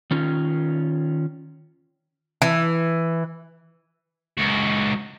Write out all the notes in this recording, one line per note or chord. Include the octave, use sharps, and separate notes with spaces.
D#3 C#4 F4
E3
C#2 F#4